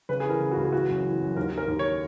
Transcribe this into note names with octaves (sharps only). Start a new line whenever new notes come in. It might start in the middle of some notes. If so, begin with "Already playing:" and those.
C#3 B4
G#4
E3 A#4
C#3
C#2 F#4
G#4
E3 F#4
F#2
E3
F#2
D#2 A#4
D#3 A#4
D#2
C#5